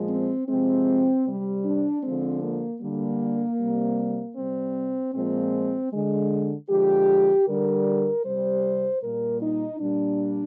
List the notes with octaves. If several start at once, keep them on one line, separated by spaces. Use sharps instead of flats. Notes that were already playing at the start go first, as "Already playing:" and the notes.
Already playing: A#2 F3 G#3
C4
C3 F3 G#3 C4
C3 G3
D4
D3 F3 G#3 C4
A#3
D3 G3 A#3
C3 G3
C3 G3 C4
A#2 F3 G#3 C4
D3 G#3
D3 F3 G#3 G4
D3 G3 A#4
C3 G3 C5
A#2 G3 A#4
D#4
A#2 G3 D4